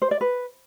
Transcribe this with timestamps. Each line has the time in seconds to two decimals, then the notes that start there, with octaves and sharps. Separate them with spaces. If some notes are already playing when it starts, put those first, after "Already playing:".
0.02 C5
0.11 D5
0.21 B4